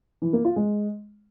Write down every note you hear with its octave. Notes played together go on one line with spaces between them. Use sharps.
E3
A#3
F4
G#3